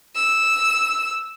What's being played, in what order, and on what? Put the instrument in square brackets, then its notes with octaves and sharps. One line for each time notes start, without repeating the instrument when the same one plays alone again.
[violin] E6